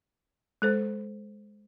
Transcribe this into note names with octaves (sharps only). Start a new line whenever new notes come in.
G#3 A4 C5